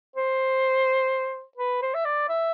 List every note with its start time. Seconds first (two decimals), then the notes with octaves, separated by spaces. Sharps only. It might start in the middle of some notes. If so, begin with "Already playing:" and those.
0.16 C5
1.57 B4
1.82 C5
1.94 E5
2.05 D5
2.29 E5